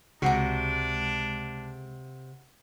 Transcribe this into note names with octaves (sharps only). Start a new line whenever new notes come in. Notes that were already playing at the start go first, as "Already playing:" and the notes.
C#2 C3 G#3 D4 F#4 F#5 A#5